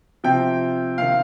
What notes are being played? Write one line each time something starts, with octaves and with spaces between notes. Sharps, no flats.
C3 F3 G5
C3 D#3 F5